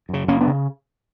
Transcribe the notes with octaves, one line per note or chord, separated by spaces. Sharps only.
F#2 C#3
F#1 A#3 C#4
B3 D4
C#3